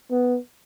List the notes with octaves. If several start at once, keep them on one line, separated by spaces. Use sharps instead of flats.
B3